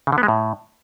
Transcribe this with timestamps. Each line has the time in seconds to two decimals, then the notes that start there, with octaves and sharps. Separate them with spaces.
0.07 C#3
0.12 D3
0.18 B3
0.23 G#3
0.28 A2